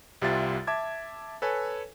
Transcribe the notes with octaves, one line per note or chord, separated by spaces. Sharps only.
C2 C3 G3 F4 E5 A6
E5 A5 D6 G#6
A4 B4 C#5 G#5